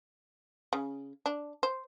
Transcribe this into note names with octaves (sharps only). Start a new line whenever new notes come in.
C#3
D4
C5